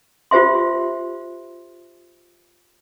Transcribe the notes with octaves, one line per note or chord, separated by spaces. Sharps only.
F4 G4 C5 E5 C6